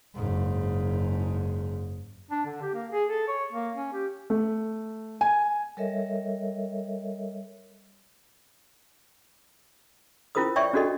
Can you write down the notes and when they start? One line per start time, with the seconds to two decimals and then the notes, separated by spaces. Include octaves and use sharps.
0.15 F#1 G#2
2.31 D4
2.46 D3
2.62 G4
2.74 A#3
2.92 G#4
3.09 A4
3.28 C#5
3.52 A#3
3.75 C#4
3.93 G4
4.30 A3
5.21 G#5
5.77 G3 A4 A#4 C#5 D#5 E5
10.35 C#4 E4 F4 A#4 C5 D#6
10.56 C#5 D5 E5 G5 C#6
10.73 C#4 D4 F#4 A4 D#5